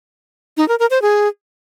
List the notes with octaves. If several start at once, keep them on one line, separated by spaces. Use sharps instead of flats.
D#4
A#4
A#4
C5
G#4